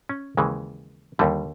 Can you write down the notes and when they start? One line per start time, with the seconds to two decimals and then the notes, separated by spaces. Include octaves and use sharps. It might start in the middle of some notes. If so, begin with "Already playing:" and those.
0.09 C#4
0.37 D#2 C#3 E3 G#3
1.19 D#2 D3 G3